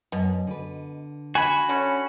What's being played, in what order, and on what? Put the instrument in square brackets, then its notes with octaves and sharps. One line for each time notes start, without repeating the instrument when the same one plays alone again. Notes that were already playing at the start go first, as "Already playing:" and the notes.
[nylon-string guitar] F#2 [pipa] B2
[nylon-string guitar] D3 B4
[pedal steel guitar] F#4 B5 [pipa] G#5
[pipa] D3 [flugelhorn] C#4